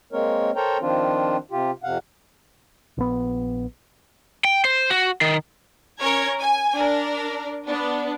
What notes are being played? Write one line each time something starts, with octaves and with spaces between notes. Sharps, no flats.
G#3 A#3 C4 A#4 C#5
A4 A#4 C5 C#5 G5 A#5
D#3 F3 C4 D4 F4
C3 F4 G4
F2 C3 F5 F#5
A#1 B3
G5
C5
F#4
D#3
C#4 A#4 C#5 G#6
G#5
D4 A#4
B3 D4